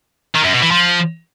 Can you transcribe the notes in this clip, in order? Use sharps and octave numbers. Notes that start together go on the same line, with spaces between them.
D#3
F#2
B2
E3
F3